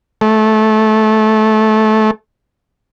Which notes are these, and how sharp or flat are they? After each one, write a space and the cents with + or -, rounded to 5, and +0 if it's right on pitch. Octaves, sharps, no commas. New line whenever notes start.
A3 -20